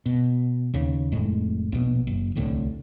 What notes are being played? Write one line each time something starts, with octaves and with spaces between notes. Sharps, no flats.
B2
D#2 C#3
F1 A2 G#3
A#1 B2
F#1
D1 C2 A2 D3